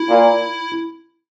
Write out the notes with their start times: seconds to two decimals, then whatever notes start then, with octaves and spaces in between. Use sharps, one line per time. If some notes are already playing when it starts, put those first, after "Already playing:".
Already playing: E4
0.09 A#2